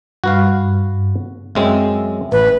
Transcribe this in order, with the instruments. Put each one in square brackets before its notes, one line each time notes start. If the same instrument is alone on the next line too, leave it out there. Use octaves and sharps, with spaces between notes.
[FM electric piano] G2 [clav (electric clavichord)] F#4 B4 F5
[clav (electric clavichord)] F#2 G#3 C4 [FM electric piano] E5
[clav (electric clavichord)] A1 [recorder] B4